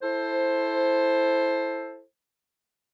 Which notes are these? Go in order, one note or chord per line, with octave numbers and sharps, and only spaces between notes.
E4 A4 C5